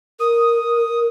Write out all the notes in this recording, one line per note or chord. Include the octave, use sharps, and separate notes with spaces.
A#4 D#6